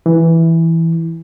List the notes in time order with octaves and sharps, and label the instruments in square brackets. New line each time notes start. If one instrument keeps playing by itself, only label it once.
[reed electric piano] E3